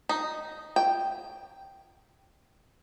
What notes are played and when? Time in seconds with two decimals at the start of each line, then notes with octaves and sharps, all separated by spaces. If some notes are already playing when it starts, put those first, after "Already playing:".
0.09 D#4
0.76 G5